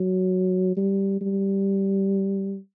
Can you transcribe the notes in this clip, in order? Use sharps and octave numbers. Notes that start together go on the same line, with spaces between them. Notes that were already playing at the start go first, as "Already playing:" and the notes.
Already playing: F#3
G3
G3